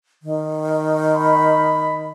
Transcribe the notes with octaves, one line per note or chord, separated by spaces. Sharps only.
D#3
B5